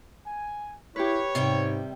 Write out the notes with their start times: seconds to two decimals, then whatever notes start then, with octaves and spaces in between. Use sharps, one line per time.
0.24 G#5
0.96 E4 G4 B4 C#5
1.35 G#2 C3 G3 G5